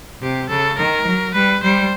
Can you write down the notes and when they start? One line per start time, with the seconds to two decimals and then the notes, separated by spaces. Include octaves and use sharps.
0.21 C3 G4
0.49 C#3 A4
0.78 D#3 A#4
1.06 F#3
1.34 G3 B4
1.62 G3 C5